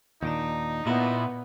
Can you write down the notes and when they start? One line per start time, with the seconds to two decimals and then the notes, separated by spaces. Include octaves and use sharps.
0.23 D#2 A#2 D4 D#4
0.87 A#2 B3 E4